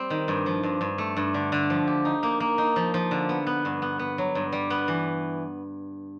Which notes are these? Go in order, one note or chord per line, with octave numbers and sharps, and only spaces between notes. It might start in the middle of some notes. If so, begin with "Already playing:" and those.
Already playing: G3 C4
D#3
G2
F3
G2
G2
A3
G2
D3
D3
F3
G4
D#4
A#3
A#3
D#4
F3
F3
D3
B3
B3
G2
B3
B3
F#3
G2
G3
B3
E3